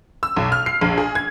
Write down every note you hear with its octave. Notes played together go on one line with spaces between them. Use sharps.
E6
B1
F6
C7
A#1
G#4
G#6